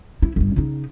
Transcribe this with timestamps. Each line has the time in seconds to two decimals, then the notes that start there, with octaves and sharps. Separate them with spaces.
0.22 E4
0.36 G1 G2
0.56 C#3 D#4